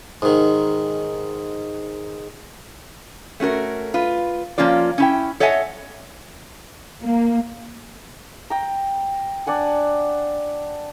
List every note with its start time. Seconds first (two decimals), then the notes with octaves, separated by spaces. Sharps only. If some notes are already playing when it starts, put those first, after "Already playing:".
0.22 G#2 D#3
3.40 A3 C#4 F#4 A#4
3.94 F4 B4
4.58 F3 A#3 C#4 F4 D5
4.98 C#4 E4 G5
5.40 A4 C#5 D#5 E5 F#5 G#5
7.02 A#3
8.50 G5 A#5
9.47 D4 D5 F#5 G#5